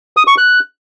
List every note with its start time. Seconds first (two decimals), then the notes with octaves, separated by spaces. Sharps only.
0.17 D#6
0.27 C#6
0.38 F#6